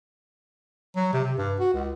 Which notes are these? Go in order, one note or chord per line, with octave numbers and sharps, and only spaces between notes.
F#3
C3
C3
G2
F#4
C#2